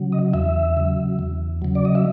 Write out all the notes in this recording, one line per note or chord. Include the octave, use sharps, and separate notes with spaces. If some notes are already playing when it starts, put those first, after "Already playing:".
Already playing: C#3 F#3
D#5
E2 E5
C#3 F#3
E2
C#3 F#3
D5
D#5
E5